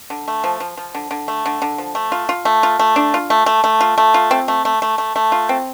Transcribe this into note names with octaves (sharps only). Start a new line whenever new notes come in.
D3
A3
F3
F3
F3
D3
D3
A3
D3
D3
F3
A3
F4
F4
A3
F4
A3
D4
F4
A3
A3
A3
F4
A3
F4
C4
A3
A3
A3
A3
A3
F4
C4